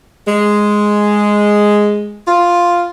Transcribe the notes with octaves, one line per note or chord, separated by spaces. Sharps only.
G#3
F4